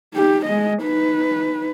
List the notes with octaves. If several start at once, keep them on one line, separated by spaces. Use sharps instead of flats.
D#4 G4
G#3 D#5
D#4 B4